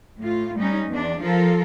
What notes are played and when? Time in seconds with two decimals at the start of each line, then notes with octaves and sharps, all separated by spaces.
0.19 A2 F4
0.58 G3 C#4 D#4
0.89 E2 D4
1.20 F3 F4 A4 A#4